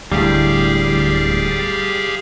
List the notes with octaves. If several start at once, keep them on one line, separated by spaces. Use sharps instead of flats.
D1 D2 A2 G3 G4 G#4 F5